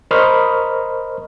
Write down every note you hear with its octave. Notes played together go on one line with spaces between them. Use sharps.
A#4 C5 D#5 B5 C#6 F6